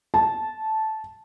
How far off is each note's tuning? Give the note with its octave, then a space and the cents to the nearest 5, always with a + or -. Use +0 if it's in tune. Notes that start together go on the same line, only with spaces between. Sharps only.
A5 -10